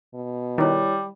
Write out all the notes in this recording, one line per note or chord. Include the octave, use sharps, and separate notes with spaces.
B2
D#3 G3 E4 C#5